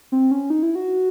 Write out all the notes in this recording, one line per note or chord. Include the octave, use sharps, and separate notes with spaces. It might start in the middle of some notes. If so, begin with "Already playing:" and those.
C4
C#4
D#4
E4
F#4